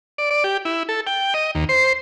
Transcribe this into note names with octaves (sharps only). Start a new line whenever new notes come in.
D5
D5
G4
E4
A4
G5
D#5
D#2
C5